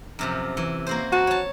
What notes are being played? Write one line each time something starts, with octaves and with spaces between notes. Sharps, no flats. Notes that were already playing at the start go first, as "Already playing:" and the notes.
F#2 C3 F3
E3
A#3 F#4 C5
F#4 A5
C#5 A5